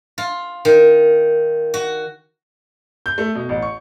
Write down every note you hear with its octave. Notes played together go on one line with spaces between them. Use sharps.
F4
D#3
F#4
G6
A3
B2
A1
C#6